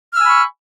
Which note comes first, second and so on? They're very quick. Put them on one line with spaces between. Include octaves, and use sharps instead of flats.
F6 E6 G#5 B5 C#6